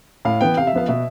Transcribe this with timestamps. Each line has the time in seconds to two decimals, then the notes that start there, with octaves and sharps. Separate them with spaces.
0.25 A2 F5
0.41 E3 B3 G5
0.57 C3 F5
0.67 E5
0.73 F3 B3 F5
0.88 B2 E5